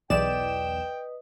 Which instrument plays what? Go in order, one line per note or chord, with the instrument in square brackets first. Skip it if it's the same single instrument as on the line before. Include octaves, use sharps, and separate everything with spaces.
[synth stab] B1 E2 E7 [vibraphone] B4 D#5 D#6 [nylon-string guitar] D5 [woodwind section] G5